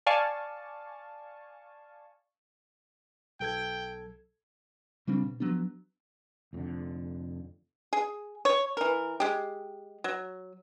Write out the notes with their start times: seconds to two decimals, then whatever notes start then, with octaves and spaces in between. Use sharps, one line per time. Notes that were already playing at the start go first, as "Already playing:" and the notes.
0.06 D5 F5 G#5 A5 C#6
3.40 B1 A4 G5 G#6
5.07 C#3 G3 C4 D4
5.23 B2
5.40 F3 F#3 B3 D4
6.53 F1 F2 G#2 D3
7.93 G#4
8.45 C#5
8.77 E3 A#4
9.20 G#3 G4
10.04 F#3